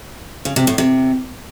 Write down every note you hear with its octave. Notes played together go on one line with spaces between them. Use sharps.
C#3
C3
A2
C3